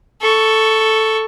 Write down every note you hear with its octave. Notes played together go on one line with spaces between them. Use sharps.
A4 C#6